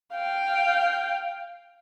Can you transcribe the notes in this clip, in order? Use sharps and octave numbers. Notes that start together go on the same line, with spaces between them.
F5 G5